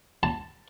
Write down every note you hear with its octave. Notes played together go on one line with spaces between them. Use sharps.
A5